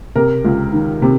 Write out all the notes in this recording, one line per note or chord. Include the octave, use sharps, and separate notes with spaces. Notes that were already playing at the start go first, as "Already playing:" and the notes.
C3 A#4
C#2
D#3
C3